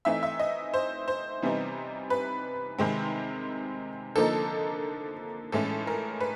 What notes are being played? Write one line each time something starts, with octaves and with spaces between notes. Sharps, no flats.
E3 A3 C4 D#4 E5
E5
D#5
C5
C5
C3 E3 G3 B3 D#4
B4
C3 D#3 G#3 C4
D3 F3 A#3 D#4 A4
A2 E3 G#3 C#4 A4
A#4
B4